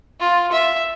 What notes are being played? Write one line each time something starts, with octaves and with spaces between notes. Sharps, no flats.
F4
E5